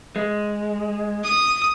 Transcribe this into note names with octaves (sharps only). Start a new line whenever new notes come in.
G#3
D#6